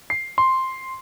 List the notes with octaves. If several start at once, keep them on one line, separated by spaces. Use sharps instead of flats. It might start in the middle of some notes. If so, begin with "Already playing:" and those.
C7
C6